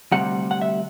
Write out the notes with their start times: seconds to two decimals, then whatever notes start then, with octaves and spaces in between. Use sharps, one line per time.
0.12 D2 C3 G3 F#5
0.51 F#5
0.61 E5